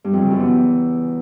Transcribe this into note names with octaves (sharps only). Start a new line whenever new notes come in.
G2
F2
C#3
F#2
E2